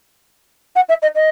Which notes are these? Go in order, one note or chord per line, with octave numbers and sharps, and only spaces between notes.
F#5
E5
D#5
D#5